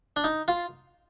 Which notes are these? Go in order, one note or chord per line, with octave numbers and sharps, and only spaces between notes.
D4
D#4
F4